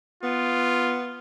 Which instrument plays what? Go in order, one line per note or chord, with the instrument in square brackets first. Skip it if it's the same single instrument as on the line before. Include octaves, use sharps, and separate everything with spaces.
[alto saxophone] B3 [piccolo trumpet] F4